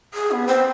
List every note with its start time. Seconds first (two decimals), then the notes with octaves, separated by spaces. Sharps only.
0.14 G#4
0.31 B3
0.47 C4